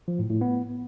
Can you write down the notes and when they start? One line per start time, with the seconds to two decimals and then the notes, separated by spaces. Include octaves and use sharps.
0.08 F3
0.19 A2
0.30 A2
0.41 B3